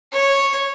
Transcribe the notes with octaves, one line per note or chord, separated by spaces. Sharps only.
C#5